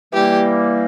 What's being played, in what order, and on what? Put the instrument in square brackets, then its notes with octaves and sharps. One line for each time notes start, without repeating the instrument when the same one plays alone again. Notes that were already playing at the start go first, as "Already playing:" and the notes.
[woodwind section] E3 G3 A#3 [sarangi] G4